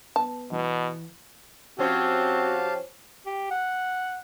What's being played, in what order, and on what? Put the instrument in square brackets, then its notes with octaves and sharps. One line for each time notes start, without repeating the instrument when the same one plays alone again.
[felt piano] B3 [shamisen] A5
[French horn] B2 [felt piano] E3
[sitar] F3 C#4 C5 [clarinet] C4 [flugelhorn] F#4 [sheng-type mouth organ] G4 F5 A5
[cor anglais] G4
F#5